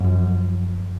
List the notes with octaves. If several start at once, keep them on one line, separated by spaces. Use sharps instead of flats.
F#2 F3